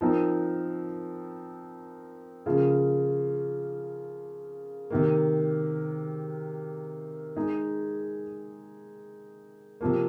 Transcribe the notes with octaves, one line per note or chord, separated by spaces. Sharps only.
F3 C4 D#4 A#4
C#3 F3 A#3 F4
C3 D#3 A#3
G#3 D#4 G#4
C3 F3 A#3